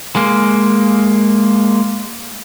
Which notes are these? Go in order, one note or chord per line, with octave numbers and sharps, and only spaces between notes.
G#3 A#3